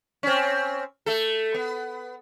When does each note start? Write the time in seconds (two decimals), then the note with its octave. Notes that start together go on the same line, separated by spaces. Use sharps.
0.23 C4 C#4
1.06 A3 A4
1.54 B3